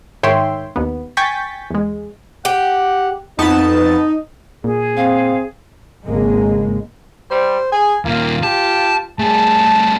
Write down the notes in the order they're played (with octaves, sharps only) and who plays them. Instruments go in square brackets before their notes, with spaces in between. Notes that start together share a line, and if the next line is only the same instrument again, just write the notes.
[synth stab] G#2 D#3 C#5 E5 G5 C6
D#2 B3
G5 G#5 C#6 G6 A6 B6
E2 G#3
[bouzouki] G4 [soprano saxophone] F#5
[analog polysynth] F2 B3 A5 [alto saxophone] D#4
[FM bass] A#2 [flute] G#4
[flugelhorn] C4 [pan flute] F5
[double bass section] G#1 C#3 G#3 A#3
[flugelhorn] G3 [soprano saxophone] C5
[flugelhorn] G#4 [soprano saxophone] G#5
[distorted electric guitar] D#2 A#2 [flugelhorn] A#3 [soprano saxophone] F4
[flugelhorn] G4 [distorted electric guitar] A5
[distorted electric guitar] G3 A3 [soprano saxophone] G#4 [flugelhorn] A5